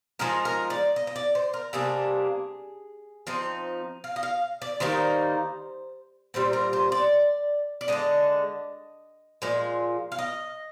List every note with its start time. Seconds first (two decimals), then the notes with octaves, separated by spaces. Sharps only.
0.19 F3 G#3 D#4 A#4
0.45 A#4
0.70 D5
0.96 D#5
1.07 D#5
1.16 D5
1.35 C5
1.54 A#4
1.73 C3 G3 A#3 D4 G#4
3.27 F3 C4 D#4
4.04 F5
4.16 D#5
4.23 F5
4.62 D5
4.80 D#3 G3 A#3 D#4 C5
6.34 A#2 G3 C4 C5
6.53 A#4
6.73 C5
6.92 D5
7.81 D5
7.88 D3 G#3 D4 D#5
9.42 A#2 F3 G#3
10.12 F5
10.19 D#5